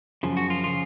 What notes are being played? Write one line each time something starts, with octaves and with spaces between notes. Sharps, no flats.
F#2 C#3 F3
F#4
F4
C#3 F3 F4